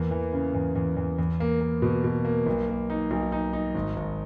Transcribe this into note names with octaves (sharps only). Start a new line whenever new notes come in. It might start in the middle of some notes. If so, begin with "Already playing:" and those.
Already playing: E2 A#3
E3
C#3
E2
E2
E2
E2
A#3
A#3
B2
B2
A#3
B1
A#3
D#4
B1
D#4
D#4
G#1
G#1